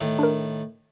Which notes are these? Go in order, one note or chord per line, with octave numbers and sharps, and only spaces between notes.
A2 D#3
D4 A#4